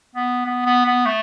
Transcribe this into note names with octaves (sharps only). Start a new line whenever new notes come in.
B3
B3
B3
B3
A3